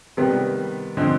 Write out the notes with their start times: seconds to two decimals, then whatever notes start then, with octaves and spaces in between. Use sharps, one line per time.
0.17 C3 D#3 G3 B3
0.97 D3 F3 G#3 C4